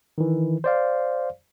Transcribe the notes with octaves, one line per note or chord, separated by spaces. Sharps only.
D#3 E3
C5 D5 F5